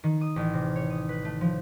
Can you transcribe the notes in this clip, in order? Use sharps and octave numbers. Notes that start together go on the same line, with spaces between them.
D#3
D#6
A1
C3
C#5
D#6
B4
A3
F3